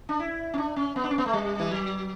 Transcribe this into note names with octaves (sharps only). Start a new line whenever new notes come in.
D4
E4
C#4
D4
C#4
B3
D4
C#4
B3
A3
G3
E3
F#3